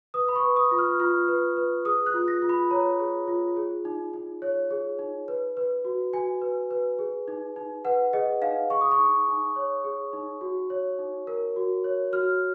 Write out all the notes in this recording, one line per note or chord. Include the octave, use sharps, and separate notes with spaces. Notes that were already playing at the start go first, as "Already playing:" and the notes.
B4 D#6
B5
C#6
B4
D#6
F4
F6
F4 F6
B4
B4
G#4 D#6
F#6
F4
A#6
F4
B5
C#5 A#5
G#4
F4
G#4
D#4
D#4
C#5
G#4
D#4
B4
B4
F#4
F#4 G#5
B4
B4
G#4
D#4
D#4
B4 F#5
G#4 D#5
D#4 F5
G#4 C#6
D#6
C#6
D#4
D#4
C#5
G#4
D#4
F#4
C#5
D#4
A#4
F#4
C#5
F#4 F6